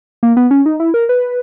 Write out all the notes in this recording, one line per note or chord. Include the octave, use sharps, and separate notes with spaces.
A#3
B3
C#4
D#4
E4
A#4
B4